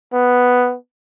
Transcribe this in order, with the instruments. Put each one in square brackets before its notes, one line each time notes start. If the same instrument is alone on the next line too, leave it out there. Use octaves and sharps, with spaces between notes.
[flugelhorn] B3